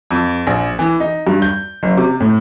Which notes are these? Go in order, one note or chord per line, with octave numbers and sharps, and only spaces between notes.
F2
A#1
E3
D#4
G2
G6
F#1
C3
A2